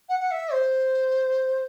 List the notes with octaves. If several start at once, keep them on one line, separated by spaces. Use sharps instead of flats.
F#5
F#5
E5
C5